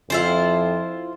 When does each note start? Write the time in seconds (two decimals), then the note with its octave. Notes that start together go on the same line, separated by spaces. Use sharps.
0.10 F2 E4 F4 C5